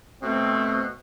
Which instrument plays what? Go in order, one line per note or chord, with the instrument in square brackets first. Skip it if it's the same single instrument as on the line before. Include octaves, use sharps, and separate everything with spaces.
[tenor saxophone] B2 [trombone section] A3 C4